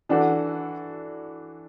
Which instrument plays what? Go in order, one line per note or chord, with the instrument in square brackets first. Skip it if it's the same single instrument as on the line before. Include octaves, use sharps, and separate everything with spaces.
[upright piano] E3 D4 F#4 A4